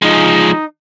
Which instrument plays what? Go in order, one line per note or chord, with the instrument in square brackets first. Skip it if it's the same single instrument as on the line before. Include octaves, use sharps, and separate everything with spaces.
[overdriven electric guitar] F3 G#3 [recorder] D#4